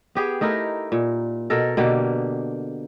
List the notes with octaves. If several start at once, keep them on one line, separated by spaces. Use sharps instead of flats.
B3 G4 G#4
A3 D#4 E4 A#4
A#2
B2 A4 A#4
B2 D3 A#3 G4